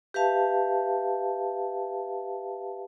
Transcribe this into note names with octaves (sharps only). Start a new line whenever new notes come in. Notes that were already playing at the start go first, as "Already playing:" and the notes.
G4 B4 E5 F5 A5